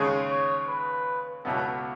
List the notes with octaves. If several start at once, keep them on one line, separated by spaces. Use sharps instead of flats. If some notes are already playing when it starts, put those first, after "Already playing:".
Already playing: D#2 C#3 G#3 C#4 G#4
C#5
B4
C#2 B2 F#3 B3 E4 A4